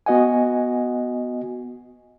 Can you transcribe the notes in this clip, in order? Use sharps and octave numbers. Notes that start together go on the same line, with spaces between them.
B3 F#4 D#5 F#5 G#5